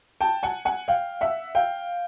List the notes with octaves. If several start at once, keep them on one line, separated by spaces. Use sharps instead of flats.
G5 A5
F#5 G#5
F#5 G#5
F5 G5
E5 F#5
F5 G5